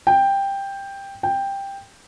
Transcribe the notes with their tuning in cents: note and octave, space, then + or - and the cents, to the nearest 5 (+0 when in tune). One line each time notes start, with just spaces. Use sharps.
G5 +10
G5 +10